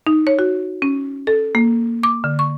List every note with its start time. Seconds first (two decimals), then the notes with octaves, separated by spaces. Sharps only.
0.07 D#4
0.27 C#5
0.39 F#4
0.82 C#4
1.27 A4
1.55 A#3
2.03 D6
2.24 D3
2.39 C#6